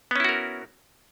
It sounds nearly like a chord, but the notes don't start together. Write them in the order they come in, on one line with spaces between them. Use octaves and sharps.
B3 C#4 E4 F#4 A#4